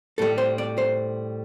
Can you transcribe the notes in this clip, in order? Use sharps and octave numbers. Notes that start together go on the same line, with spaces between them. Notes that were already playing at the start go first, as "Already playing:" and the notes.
A2 G3 A4
C5
D5
C5